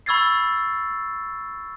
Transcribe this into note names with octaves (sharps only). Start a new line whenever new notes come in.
B5 C#6 E6 G#6 A6 C7